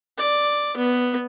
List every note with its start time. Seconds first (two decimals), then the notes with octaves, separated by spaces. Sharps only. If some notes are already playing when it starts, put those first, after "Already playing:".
0.18 D5
0.77 B3